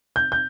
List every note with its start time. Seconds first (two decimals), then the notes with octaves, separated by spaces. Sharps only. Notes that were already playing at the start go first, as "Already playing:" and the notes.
0.16 G6
0.32 G6